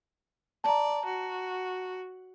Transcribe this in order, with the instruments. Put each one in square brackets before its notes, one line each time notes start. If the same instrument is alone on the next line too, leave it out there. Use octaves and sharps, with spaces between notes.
[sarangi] D5 [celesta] A5 A#5
[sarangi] F#4